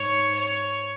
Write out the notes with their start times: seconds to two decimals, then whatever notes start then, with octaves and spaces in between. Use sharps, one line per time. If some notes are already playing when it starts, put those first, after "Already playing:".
Already playing: G#2 C#5
0.34 C#5